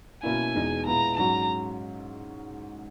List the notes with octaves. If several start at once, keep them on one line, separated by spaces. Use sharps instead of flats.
B2 A#3 C#4 E4 G#5
E2 B2 G#3 D#4
A#2 G#3 B3 E4 A#5
G#2 F#3 C#4 F#4 A#5